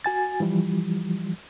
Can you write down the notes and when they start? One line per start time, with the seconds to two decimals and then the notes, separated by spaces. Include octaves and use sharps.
0.04 F#4 G#5 A6
0.40 E3 F3 G3